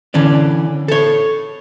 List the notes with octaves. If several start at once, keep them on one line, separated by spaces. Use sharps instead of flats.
D3 E3 C#4 D5
A4 C#5